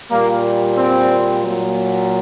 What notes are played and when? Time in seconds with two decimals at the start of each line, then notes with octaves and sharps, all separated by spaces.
0.11 A#2 G3 A#3
0.77 C4
1.42 A#2 F#3